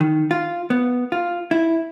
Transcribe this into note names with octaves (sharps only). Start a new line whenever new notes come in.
D#3
F4
B3
F4
E4